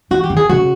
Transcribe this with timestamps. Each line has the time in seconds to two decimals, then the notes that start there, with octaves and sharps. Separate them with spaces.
0.11 E3 F#4
0.24 G4
0.30 D#3
0.37 G#4
0.50 C#3 F#4